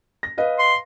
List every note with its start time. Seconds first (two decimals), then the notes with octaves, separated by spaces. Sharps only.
0.23 A#6
0.38 B4 D#5 F5
0.59 C6